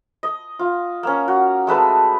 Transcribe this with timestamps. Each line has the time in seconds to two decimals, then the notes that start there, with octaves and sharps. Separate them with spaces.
0.23 D#5
0.59 F4
1.03 A#3 C#4
1.28 F#4
1.67 G#3 A3 B4 A5